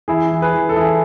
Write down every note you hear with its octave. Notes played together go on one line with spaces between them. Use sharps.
E3 E4 G#4
E3
G#4 B4
E3
A4
E3 E4 G#4